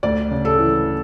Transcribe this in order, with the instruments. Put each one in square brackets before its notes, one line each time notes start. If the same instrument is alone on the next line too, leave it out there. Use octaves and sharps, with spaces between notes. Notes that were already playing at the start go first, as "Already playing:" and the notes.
[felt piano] D2 D5
C#3
A4
E3